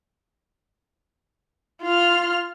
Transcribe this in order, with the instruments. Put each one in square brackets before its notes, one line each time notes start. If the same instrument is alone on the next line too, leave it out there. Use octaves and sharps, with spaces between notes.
[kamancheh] F4 F6